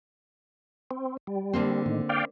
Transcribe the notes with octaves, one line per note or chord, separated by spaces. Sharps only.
C4
G3
D3 A#3 C4
A2 D#3
D5 F5 G5